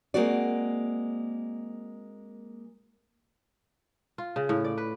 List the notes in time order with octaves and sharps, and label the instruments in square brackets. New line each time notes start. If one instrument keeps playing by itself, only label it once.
[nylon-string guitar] G#3 A#3 C4 F#4 D5
[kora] F4
C#3
A2
D5
B4